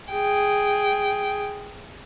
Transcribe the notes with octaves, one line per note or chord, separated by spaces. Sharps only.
G#4 G5